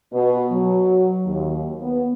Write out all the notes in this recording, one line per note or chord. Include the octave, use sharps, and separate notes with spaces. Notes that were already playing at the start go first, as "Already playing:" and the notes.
B2
F#3
D#2
B3